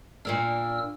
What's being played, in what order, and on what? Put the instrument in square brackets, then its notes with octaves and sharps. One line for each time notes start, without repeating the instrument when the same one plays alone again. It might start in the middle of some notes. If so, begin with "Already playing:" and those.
[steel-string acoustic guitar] A#2 A#3 D4 [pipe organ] E6 F6